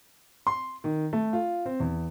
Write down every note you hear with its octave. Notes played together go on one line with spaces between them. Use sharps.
C6
D#3
A3
F4
C4
E2